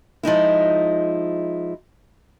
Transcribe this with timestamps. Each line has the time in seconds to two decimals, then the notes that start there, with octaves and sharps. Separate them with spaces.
0.23 F3 G#3 D#4 E4